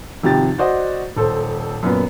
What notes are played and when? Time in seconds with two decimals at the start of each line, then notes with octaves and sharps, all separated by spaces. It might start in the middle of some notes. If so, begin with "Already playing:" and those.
0.23 G#1 C3 F3 G4 G5 A6
0.58 F#4 C5 D5 D#5 F#5
1.16 D#1 A4 C5
1.83 F#2 A#2 B3